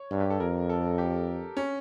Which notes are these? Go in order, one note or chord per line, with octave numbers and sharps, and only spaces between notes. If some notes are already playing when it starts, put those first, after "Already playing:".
Already playing: C#5
G2
G4
A4
F2 A#4
A4
G4
C#4